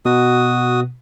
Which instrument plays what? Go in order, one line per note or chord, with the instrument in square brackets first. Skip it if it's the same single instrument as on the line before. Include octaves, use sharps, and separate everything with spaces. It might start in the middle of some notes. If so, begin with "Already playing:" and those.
[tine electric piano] B2 [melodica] F#4 D#6